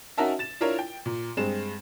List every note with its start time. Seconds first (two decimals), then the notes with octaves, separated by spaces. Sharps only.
0.18 C#4 D#4 F#4 A#4 E5 A5
0.39 A6 E7
0.61 D4 E4 F4 A#4 C#5
0.79 G5
1.06 A#2
1.37 G2 G#3 C4 E7